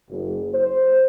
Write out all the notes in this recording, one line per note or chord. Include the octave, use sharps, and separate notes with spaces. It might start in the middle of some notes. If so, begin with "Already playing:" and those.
F#1
C5